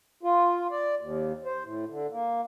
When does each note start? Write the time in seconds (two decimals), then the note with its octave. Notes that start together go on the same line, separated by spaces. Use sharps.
0.23 F4
0.71 D5
1.01 D#2
1.45 C5
1.64 A2
1.90 D3
2.11 A#3